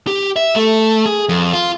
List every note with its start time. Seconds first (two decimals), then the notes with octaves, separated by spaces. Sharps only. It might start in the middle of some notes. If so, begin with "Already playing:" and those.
0.07 G4
0.36 E5
0.56 A3
1.06 G#4
1.29 F2
1.53 F4